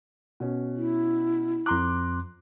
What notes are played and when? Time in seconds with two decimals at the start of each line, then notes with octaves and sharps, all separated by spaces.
0.40 B2 C#4
0.77 E4
1.66 F2 A#5 C6 D6 F#6